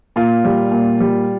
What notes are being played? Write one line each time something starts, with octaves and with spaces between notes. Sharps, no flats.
A#2 F4
G3
A#2
G3